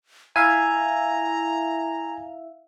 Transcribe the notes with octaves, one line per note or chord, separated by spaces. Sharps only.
E4 E5 F5 G#5 A#5